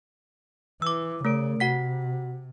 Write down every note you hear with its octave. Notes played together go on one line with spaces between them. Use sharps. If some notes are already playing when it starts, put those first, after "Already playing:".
E3 D6 E6
C#3 A3 A#4 D7
C3 F#4 F#5 B6